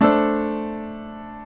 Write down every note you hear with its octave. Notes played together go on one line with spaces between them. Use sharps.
A3 D4 A4 C5